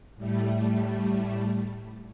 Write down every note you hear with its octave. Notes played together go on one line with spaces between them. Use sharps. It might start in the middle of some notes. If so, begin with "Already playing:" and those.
A2 G3 A3